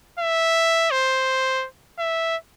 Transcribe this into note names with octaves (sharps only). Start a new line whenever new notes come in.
E5
C5
E5